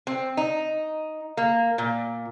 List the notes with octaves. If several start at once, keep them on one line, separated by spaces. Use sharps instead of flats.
C4
D#4
A#3
A#2